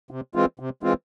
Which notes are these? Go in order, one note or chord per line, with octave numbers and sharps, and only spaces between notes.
C3
E3 G#3 C4 F4
C3
E3 G#3 C4 F4